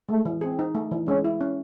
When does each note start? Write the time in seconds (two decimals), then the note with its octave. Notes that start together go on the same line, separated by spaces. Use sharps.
0.09 G#3 A3
0.25 E3
0.41 C4 G#4
0.59 D#4
0.75 A3
0.91 E3
1.08 G#3 C#4
1.24 E4
1.41 C#4